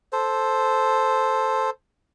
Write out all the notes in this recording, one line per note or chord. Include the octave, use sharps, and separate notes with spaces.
A4 C5